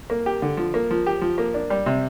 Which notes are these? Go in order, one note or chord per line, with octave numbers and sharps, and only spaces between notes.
A#3
G4
D3
F3
A#3
F3
G4
F3
A#3
D4
G3
C3